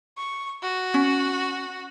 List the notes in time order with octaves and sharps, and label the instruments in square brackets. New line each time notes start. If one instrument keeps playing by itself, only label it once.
[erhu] C#6
F#4
[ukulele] C#4